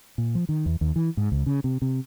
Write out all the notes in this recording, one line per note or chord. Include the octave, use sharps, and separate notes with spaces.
A#2
F3
D#3
E2
D#2
E3
G#2
C#2
C#3
C3
C3